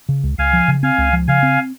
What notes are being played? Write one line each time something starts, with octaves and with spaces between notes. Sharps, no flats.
C#3
C#2
C#2 F5 G#5
F3
C#3
C4 F5 G#5
C#2
F3
C#3 F5 G#5
C4